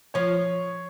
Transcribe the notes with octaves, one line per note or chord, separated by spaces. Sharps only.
F3 C#5